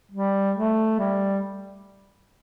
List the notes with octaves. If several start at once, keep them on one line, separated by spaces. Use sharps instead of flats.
G3
A3
G3